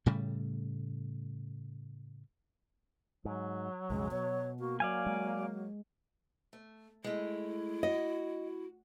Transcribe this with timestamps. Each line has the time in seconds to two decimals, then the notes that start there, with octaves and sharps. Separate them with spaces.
0.06 A2 C#3 G3 A3
3.25 G#2 F#3
3.90 B1 F2 C#3 G#3
4.11 B2 C#5
4.59 A#3 F#4
4.80 F#3 D5 F5 G#5
5.06 G#3
6.53 A3
7.04 G#3 A3 E4
7.83 F#4 D#5